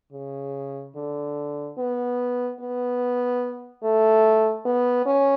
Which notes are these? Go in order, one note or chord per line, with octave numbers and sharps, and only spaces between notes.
C#3
D3
B3
B3
A3
B3
C#4